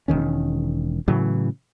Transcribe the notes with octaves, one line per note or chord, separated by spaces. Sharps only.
E1 C2 D#3 C#4
A2 C#3 E3 F#3